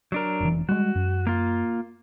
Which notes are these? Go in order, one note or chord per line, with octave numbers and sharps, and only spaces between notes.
F#3 D4 A#4
F1 E3
G3 G#3 F#4
F#2
A#3 F4